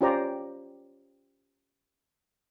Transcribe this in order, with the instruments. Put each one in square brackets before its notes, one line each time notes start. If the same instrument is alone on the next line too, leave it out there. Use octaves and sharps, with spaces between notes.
[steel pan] C#4 F4 G4 C5 D5 A#5